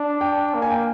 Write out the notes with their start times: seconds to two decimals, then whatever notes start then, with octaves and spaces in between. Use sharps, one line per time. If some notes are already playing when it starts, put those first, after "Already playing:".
Already playing: D4
0.21 G5
0.54 A#3
0.62 G#5
0.71 G5